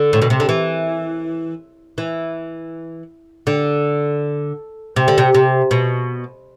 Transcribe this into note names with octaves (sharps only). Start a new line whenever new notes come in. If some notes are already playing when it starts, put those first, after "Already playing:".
Already playing: D3
A2
B2
C3
D3
E3
E3
D3
C3
D3
C3
C3
B2